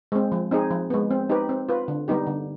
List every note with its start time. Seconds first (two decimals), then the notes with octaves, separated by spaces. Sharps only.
0.12 G#3 C4
0.32 F3
0.51 C4 D#4 G#4
0.71 F3
0.90 G#3 B3
1.11 C4
1.29 D#4 G4 B4
1.49 C4
1.69 F4 B4
1.88 D3
2.08 G3 B3 D#4 G4
2.27 D3